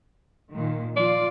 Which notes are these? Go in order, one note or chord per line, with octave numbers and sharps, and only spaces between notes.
A#2 D#3
F3 F4 D5